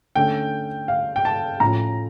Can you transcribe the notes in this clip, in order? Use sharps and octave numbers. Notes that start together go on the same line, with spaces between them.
D3 A3 C#4 G5
F5
G5
A5
A2 F3 C#4 A#5